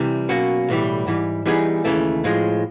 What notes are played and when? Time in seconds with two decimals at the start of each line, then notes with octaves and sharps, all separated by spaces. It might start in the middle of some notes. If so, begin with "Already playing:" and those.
Already playing: C3 E3 G3
0.29 B2 F#3 A#3 C#4 F#4
0.68 B1 A2 E3 G3
1.07 G#2 E3 G3
1.46 E3 G3 B3 D#4 G#4
1.85 D#2 C#3 E3 A3
2.24 A2 F3 G#3